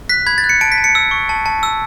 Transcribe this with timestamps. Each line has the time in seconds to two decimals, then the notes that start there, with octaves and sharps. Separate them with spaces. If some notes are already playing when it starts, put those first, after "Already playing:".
0.09 F#6 B6
0.26 B5 G#6
0.38 A6
0.44 F#6
0.49 C#7
0.61 A5 D7
0.72 B6
0.78 A5
0.84 C#7
0.95 E6
1.11 C#6
1.29 A5
1.46 A5
1.63 E6